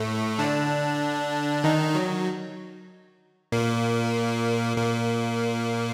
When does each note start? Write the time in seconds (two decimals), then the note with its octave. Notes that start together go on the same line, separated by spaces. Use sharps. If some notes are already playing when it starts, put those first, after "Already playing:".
Already playing: A2 A3
0.39 D3 D4
1.64 D#3 D#4
1.95 F#3
3.52 A#2 A#3
4.77 A#2 A#3